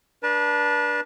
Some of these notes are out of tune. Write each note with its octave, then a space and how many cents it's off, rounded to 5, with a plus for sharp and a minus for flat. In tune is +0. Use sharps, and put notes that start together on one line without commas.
D4 +0 B4 -35 A5 +0